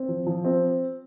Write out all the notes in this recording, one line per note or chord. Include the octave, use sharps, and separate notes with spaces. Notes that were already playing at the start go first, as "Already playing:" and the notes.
Already playing: C4
F3
F3
C4